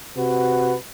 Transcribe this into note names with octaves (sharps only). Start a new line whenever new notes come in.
C3 F#4 B4